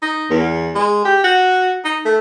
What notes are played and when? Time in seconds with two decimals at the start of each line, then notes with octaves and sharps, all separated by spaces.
0.02 D#4
0.30 E2
0.75 G#3
1.05 G4
1.24 F#4
1.85 D#4
2.05 A3